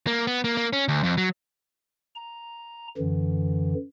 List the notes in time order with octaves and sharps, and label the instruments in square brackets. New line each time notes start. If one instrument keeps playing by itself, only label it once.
[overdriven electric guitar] A#3
B3
A#3
A#3
C#4
D2
F2
F#3
[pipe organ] A#5
F#2 D3 E3